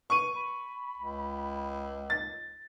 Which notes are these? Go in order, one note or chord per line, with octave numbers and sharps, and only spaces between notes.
B4 C#6 D#7
B5
C#2
A6